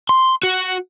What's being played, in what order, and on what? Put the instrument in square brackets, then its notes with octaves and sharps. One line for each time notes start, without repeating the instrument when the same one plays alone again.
[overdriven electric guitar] C6
F#4